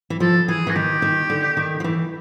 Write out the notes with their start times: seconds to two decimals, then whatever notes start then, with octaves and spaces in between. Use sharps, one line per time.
0.10 E3
0.20 F3 A4
0.48 E3 G#4
0.67 E3
0.70 F#4
0.76 D#3 G4
1.02 D#3
1.30 D3
1.57 D#3
1.80 F3
1.84 E3